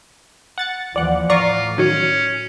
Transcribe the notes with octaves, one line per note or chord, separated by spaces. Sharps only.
F#5 A6 C#7
D#2 E3 F3 D5 F#5
A2 F4 D5 A#5 C#6
D#3 F#3 C#4